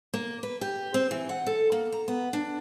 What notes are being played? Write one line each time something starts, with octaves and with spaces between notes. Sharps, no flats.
A#3
B4
G4
C4
E3
F#5
A4
A#3
A#5
B3
D4